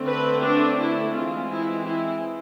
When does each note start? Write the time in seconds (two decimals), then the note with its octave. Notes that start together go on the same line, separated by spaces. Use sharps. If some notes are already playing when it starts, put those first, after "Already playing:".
Already playing: D3 A3 C4
0.08 B4
0.44 D4
0.79 E4
1.14 E3 G#3 C4 F4
1.50 E4
1.85 E4